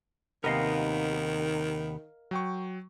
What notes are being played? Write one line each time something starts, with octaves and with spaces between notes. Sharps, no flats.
D#2 C3 D#3 B3 A#4 D#5 F5
F#3 G5 C#6